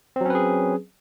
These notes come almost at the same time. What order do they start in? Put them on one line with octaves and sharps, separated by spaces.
C4 F#3 C#4 B4 G#4